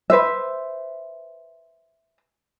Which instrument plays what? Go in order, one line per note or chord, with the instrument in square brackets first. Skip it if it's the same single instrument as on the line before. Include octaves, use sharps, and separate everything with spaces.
[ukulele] B4 C5 E5